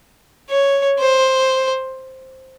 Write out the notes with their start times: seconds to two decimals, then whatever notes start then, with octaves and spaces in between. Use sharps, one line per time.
0.50 C#5
0.99 C5